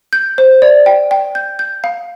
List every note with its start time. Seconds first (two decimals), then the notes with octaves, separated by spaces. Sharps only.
0.13 G6
0.38 C5
0.62 D5
0.86 G5
1.11 G5
1.35 G6
1.59 G6
1.84 F5